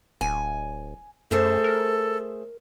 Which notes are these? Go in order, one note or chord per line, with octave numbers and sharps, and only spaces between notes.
D1 G#5
F#2 A3 G#4 A4 C5
A#4